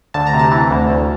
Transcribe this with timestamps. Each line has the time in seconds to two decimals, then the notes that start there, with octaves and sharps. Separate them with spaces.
0.14 D2 A5
0.27 A#5
0.34 C3
0.39 A5
0.52 E3
0.70 D2
0.89 D2